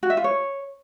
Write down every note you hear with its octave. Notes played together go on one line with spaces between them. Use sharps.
F#4
E5
F4
C#5